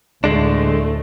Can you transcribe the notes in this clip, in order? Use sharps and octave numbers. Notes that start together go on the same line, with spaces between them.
D2 A2 D3 G#3 A3 D4